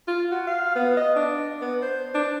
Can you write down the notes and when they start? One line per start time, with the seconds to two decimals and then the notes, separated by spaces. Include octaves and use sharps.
0.08 F4
0.32 F#4
0.47 F5
0.75 B3
0.97 D#5
1.16 D4
1.61 B3
1.82 C5
2.14 D4